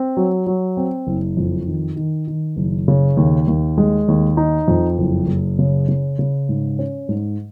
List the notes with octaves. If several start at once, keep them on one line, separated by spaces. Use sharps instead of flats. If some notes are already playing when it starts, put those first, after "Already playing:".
Already playing: C4
F#3
F#3
C4
F#1
F2
D#3
D#3
D#3
F#1
C#3
D#2
D#2
G#3
D#2
D#4
F2
F#1
F#1
C#3
C#3
C#3
G#2
C#4
G#2